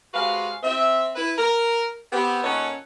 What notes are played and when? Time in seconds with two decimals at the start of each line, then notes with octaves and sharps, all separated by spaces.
0.13 C3 G#3 F#4 B4 F5
0.63 C4 E5
1.16 E4 B4
1.38 A#4
2.12 B3 C4 G4
2.43 A#2 C#4 D#4 A4 C#5 F#5